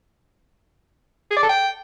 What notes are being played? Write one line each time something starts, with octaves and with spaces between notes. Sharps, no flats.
G#4
D5
A4
G5